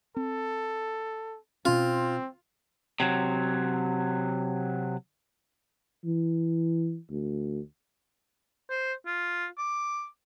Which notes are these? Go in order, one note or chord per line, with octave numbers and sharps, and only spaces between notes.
C4 A4
B2 C4 C#4 F4
C3 F#3
E3
D2
C5
F4
D6